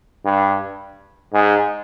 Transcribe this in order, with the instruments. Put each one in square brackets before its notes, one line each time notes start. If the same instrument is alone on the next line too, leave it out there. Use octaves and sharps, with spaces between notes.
[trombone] G2
G#2